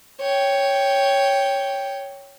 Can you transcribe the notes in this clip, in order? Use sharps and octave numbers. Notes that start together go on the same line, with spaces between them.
C#5 G5